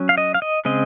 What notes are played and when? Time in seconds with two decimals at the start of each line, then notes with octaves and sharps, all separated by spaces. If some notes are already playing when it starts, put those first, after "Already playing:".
Already playing: F#3 C#4
0.09 F5
0.18 D#5
0.34 F5
0.42 D#5
0.65 C#3 G#3 C4 D#5